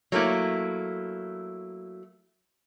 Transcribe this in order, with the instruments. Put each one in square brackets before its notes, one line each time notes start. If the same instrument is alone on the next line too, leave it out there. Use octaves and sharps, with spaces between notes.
[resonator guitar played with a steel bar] F#3 A3 A#3 E4